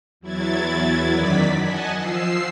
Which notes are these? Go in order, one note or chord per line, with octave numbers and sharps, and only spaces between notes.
E2 F#3 E4 G#6 A6
F#2 D#3 F#3 D5 B6
D#5 F#5 G#5 A5
F3 E6 C7